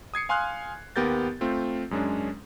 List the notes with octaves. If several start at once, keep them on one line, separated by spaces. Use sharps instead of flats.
D#6 G#6 C7 C#7
F5 G#5 C6 D#6 F6 F#6
D#2 B3 G4 A#4 G6 A6
A3 C4 F4
F#2 G#3 C#4 D4